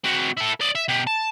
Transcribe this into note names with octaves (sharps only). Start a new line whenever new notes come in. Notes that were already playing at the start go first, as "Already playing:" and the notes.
C4 F#4
E4 A4
D5 D#5
E5
B2 G4
A5